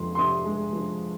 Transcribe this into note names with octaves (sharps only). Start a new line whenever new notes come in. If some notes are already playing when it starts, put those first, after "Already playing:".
Already playing: F2 F3 G#3 C6
C6
C3 D#6
G#3
F3